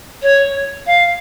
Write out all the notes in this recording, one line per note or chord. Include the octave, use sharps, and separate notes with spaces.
C#5
F5